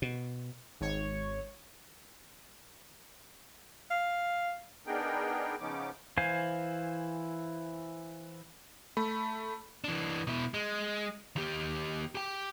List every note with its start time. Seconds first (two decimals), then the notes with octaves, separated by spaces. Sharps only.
0.02 B2
0.80 G#1 C#5
3.90 F5
4.87 B3 D4 D#4 G#4 A#4 G5
5.60 C#3 F3 B3 C#4 D#4 D6
6.18 E3 C5 F5 G#5
8.97 A3 B5
9.84 E3 D4
10.27 B2 E4
10.54 G#3
11.36 D#2 G4
12.15 G4 G5